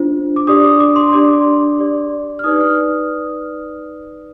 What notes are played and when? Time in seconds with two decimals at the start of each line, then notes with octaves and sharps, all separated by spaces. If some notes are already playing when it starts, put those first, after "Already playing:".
Already playing: D4 F4 C5
0.36 D6
0.47 D4 G4 D5 D#6
0.64 D6
0.80 D6
0.96 C6
1.08 C6
1.12 D4 G4 D5 D6
1.79 G4 D5
2.39 F6
2.44 D#4 B4 D5 D#6
2.61 F6